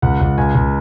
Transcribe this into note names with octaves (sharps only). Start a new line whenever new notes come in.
C#2 F#5
C#2
C#2 G#5
C#2